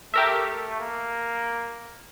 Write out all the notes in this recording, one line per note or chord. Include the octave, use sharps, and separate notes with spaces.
A3 G4 A#4 E5
A#3